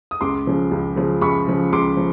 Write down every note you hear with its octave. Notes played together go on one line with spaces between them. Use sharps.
D#6
C#2 C6 D6
C#3 F3
C#2
C#3 F3
C#2 B5 C#6
C#3 F3
C#2 C6 D6
F3